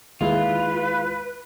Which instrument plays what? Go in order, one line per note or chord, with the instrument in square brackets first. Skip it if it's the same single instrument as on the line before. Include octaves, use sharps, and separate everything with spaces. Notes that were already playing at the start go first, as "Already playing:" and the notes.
[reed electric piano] D#2 G#3 E4 [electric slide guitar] F4 [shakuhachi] B4